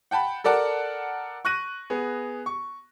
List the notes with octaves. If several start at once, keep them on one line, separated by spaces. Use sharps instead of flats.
F#5 G5 A5 B5
A4 A#4 D5 F#5 A5
C#6 F#6 A#6 D#7
B3 G#4
C#6